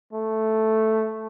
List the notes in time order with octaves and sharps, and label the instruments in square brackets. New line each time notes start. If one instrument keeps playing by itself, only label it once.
[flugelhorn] A3